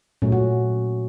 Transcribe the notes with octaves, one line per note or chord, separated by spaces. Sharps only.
A#2 F#3 A3 C#4
F#4